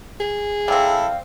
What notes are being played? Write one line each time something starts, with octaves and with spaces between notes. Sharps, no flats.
G#4
G3 C4 E4 A4 F5